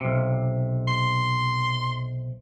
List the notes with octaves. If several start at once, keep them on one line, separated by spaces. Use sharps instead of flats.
B1 C3
C6